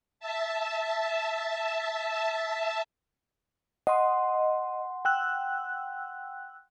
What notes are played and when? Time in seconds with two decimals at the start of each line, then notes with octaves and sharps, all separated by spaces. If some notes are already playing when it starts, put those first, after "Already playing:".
0.20 E5 A5
3.87 D#5 F#5 C6
5.05 G5 E6 F#6